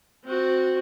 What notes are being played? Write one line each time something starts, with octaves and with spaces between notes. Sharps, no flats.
C4 F#4